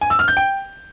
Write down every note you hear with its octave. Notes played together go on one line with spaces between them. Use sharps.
G#5
E6
F6
G6
G5